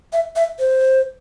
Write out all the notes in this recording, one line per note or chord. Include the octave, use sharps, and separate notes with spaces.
E5
E5
C5